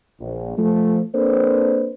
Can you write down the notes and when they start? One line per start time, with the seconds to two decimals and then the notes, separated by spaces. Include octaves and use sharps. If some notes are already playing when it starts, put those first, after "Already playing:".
0.20 A#1
0.58 F3 A3
1.15 A#3 C4 D4 A4 B4 C5